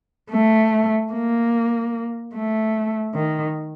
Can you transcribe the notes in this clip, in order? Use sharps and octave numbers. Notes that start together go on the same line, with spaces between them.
A3
A#3
A3
D#3